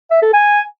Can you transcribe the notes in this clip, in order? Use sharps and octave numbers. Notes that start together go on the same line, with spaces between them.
E5
A4
G#5